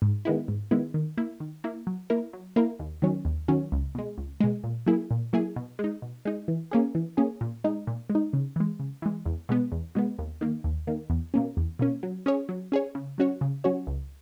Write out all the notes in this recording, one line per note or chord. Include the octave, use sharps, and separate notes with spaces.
G#2
D#3 G#3 B3 E4
G#2
D#3 G#3 B3 E4
D#3
A#3 E4
D#3
A#3 E4
F#3
A#3 E4 A#4
F#3
A#3 E4 A#4
D#2
D#3 F#3 C#4
D#2
D#3 F#3 C#4
C#2
B2 G#3
C#2
B2 G#3
A#2
F#3 A#3 E4 G#4
A#2
F#3 A#3 E4 G#4
B2
G#3
D#4
B2
G#3 D#4
E3
A#3 C#4 G#4
E3
A#3 C#4 G#4
A#2
G#3 D#4
A#2
G#3
D#4
C#3
E3 G#3
C#3
E3 G#3
E2
B2 G#3 B3
E2
B2 G#3 B3
D#2
D#3 A#3
D#2
D#3 A#3
E2
B2 A#3 C#4
E2
B2 A#3 C#4
F#3
C#4 G#4 C#5
F#3
C#4 G#4 C#5
C#3
F#3 C#4 F#4 C#5
C#3
F#3 C#4 F#4 C#5
C#2